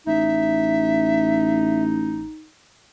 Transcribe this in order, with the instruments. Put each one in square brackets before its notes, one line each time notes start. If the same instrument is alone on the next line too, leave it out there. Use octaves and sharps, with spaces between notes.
[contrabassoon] A1 [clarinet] D#4 [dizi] E5